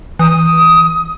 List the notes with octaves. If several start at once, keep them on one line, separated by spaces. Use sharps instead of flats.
E3 D#6